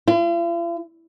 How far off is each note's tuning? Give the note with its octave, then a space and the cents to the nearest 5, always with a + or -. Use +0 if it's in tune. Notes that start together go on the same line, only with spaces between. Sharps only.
F4 -45